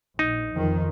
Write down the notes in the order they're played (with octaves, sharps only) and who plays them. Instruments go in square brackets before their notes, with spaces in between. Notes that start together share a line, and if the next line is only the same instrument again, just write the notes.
[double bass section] A#1 [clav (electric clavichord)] D#4
[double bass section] F2 D#3 F3